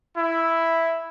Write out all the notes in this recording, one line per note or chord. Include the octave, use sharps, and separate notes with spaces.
E4